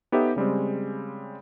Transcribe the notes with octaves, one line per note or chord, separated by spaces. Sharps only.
B3 D#4 G4 A4 C#5 E5
C#3 G3 G#3 C4